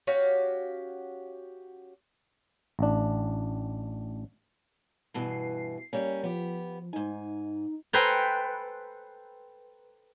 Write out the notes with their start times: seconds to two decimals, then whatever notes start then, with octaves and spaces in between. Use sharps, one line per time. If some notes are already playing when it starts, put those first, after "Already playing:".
0.07 C#4 F#4 G4 F5
2.79 A1 D4
5.14 G2 B2 E3 C7
5.93 G3 A#3 C#4
6.23 F3 B3 G4
6.93 G#2 D#4 G#5
7.93 A4 B4 C5 G5 G#5 A#5